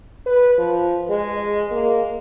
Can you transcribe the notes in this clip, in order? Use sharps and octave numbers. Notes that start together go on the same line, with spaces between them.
B4
F3
G#3
A#3